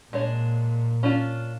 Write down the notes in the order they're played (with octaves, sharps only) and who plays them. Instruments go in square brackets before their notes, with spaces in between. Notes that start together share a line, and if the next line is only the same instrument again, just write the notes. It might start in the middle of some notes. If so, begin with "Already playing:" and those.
[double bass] A#2 [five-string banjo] G#3 D4 C#5
[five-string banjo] C#4 D4 F4